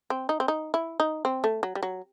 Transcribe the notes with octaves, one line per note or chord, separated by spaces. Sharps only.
C4
D#4
C4
D#4
E4
D#4
C4
A3
F#3
G3
F#3